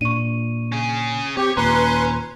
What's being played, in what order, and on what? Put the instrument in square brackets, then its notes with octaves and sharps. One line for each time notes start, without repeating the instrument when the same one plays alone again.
[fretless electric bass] A#2 D4 [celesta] C#6 D#7
[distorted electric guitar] C#4 G#4
[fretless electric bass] C4 [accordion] G4 [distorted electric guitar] C#5
[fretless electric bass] D#2 A#2 [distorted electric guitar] C#4 [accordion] B4 C6 [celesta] A#5